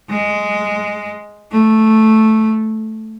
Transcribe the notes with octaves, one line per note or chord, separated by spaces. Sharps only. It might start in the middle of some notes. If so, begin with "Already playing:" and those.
G#3
A3